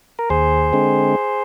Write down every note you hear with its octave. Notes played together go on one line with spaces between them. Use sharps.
A#4
D#2 G#4 C5
D3 G#3 C4